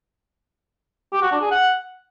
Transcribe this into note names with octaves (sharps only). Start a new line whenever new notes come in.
G4
F#4
D4
G#4
F#5